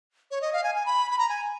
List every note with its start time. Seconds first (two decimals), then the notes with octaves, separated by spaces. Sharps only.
0.31 C#5
0.41 D#5
0.53 F5
0.64 G#5
0.75 G#5
0.86 B5
1.11 B5
1.19 A#5
1.29 G#5